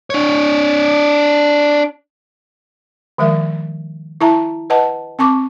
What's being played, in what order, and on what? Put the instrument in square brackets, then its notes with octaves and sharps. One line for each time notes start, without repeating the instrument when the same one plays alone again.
[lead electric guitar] D4 C#5
[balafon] D#3 F3 G#3 A#4 E5
E4 E5 A5 A#5
B4 D#5 F#5 A5
C4 A5 C#6 D6